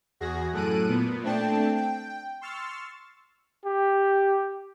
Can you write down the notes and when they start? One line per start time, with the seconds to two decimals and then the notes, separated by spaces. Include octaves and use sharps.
0.20 E2 F#4 G#4 A#6
0.53 F#2 A2 A4 F#6 D7 D#7
0.89 A#2 B3
1.23 A3 C4 D4 G5 A5
1.76 G5
2.41 C6 C#6 E6 F6 A6
3.65 G4